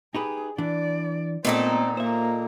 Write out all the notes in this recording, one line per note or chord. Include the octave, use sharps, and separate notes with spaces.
D#4 G4 G#4 B4
E3 D4 D5
A#2 A3 B3 C4 D#4 A4 D5
A#3 C5 E5